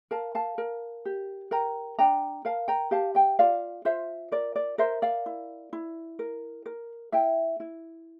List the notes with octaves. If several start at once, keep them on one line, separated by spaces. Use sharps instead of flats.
A#4 F5 A5
F5 A5
A#4
G4
A#4 G5 A#5
D4 G5 A#5
A#4 F5 A5
G5 A#5
G4 F5 A5
E5 G5
F4 D5 F5
F4 C5 E5
A#4 D5
D5
A#4 C5 E5
D5 F5
E4
E4
A#4
A#4
E4 E5 G5
E4